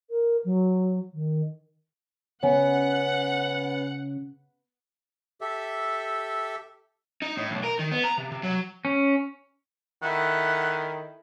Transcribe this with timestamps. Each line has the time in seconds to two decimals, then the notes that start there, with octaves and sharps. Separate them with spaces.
0.10 A#4
0.44 F#3
1.13 D#3
2.43 C#3 B3 C#5 F#5 G#5
5.41 G4 A4 E5
7.22 D#4
7.37 A2
7.51 B1
7.64 A#4
7.79 D#3
7.91 B3
8.04 A#5
8.18 C3
8.32 C3
8.43 F#3
8.85 C#4
10.03 D#3 E4 A4 F#5